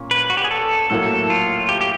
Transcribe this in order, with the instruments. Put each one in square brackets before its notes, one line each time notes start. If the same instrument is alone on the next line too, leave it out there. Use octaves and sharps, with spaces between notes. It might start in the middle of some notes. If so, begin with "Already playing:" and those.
Already playing: [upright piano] A#2 C#4
[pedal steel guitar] B4
F#4
G4
G#4
A4
[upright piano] A2 F#3 A#3 [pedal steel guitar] A4
[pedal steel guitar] F4
G4
G4